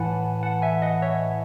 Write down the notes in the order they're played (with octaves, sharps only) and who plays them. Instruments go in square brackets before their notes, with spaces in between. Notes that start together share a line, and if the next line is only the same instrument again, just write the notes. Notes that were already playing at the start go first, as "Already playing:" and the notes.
Already playing: [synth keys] A2 E3 F#5 G#5 A5 B5
F#5 A5
E5 G#5
D#5 F#5
C#5 E5